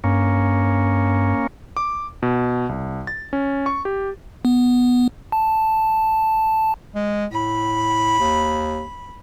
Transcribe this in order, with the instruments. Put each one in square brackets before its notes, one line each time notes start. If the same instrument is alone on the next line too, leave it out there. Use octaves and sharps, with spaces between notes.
[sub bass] G2 [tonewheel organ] A#3 C#4
[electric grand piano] D6
B2
C2
A6
C#4
C#6
G4
[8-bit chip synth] B3
A5
[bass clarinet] G#3
[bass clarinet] A2 [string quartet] B5
[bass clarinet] D#2